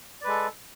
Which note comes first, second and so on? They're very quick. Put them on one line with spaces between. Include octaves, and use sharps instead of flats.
D5 B4 G#3 A4